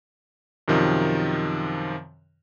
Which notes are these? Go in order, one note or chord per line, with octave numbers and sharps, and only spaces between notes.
F#2 C3 D#3 F3